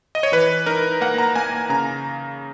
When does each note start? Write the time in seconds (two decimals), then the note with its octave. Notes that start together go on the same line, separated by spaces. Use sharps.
0.15 D#5
0.23 C#5
0.32 E3 B4
0.66 D#4 A#4
1.01 A#3 F#5
1.18 A#5
1.35 A#3 G#5
1.53 G#5
1.69 C#3 A#5